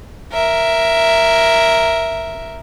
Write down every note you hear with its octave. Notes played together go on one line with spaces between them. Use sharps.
A#4 E5